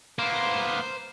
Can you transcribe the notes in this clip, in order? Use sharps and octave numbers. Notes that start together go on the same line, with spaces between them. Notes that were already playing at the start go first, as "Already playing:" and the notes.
A#3 B3 C5